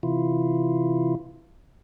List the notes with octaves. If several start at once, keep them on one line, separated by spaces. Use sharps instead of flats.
C3 E3 E4 F4